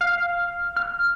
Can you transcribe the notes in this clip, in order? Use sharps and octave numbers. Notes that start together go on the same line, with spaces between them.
F5
F6